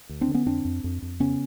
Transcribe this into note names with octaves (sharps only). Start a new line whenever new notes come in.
D2
C4 D4
D3
B3 C#4
F2 C4 D4
F2
F2
F2
C#3 B3 C#4